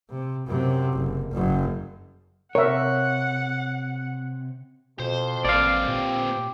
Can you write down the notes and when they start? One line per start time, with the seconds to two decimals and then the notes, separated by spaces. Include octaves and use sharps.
0.10 C3
0.47 F#2 C3
0.93 F#1
1.32 F#1 F#2
2.55 C3 A#4 C#5 E5 F#5
5.00 F2 B2 C5
5.45 A1 A#3 C4 D5 F5
5.88 A#2 G4